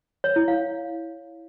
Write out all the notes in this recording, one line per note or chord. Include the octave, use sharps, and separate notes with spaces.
C#5
E4
F5